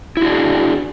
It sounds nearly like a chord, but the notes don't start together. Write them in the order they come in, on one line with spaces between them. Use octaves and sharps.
E4 F#4 D4 G#4